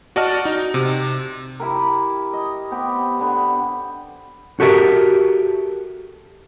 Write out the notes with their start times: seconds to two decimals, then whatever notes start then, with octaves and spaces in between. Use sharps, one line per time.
0.16 F#4 D5 D#5 A5 F6
0.45 D#4
0.74 C3
1.60 E4 G4 A#4
2.33 D#5
2.71 B3 C4 G4
3.19 D3 B3
4.60 F#4 G4 A4 A#4 E5